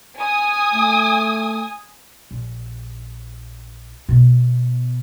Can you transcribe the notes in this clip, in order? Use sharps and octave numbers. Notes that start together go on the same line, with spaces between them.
G#5 D#6
A3
A#1
B2